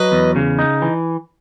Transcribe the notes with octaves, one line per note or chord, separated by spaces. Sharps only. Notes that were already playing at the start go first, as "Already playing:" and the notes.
Already playing: F#3 B4 D#5
E2
C#3
D#4
E3